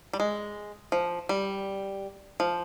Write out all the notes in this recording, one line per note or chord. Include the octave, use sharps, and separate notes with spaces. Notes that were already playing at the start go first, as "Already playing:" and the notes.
G3
G#3
F3
G3
F3